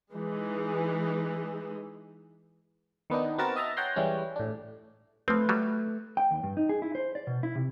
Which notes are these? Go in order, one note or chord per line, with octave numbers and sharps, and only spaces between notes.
E3 G#3 D#4
D#3 B3 D4 D#4
B3 C4 F#4 A#4 A5
D#4 D#5 E5 A5 A#5
C#5 F#5 G5 A#5 C6
E3 G3 G#3 C#4
A2 D4
F3 A3 C4 B4
F#3 G3
G5
D#2
G2
D#4
G#4
E4
C5
D5
B2
E4
C3